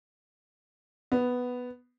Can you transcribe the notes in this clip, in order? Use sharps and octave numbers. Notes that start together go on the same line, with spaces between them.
B3